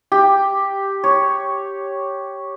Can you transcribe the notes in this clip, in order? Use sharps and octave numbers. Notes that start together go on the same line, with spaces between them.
G4
C#5